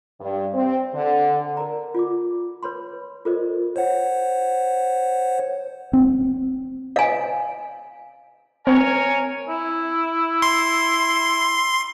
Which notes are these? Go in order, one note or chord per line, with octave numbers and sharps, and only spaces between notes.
G2
C4
D3
A#4 D5 A#5
F4 D5 D6
B4 C#5 B5 C6
F4 A4 A#4 C5 D5 D#5
C5 C#5 F#5
C4
F5 G#5
C4 A#4 C#5 G#5
E4
C6 C7